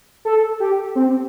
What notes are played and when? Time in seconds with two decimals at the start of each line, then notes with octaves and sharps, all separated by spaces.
0.25 A4
0.60 G4
0.95 C4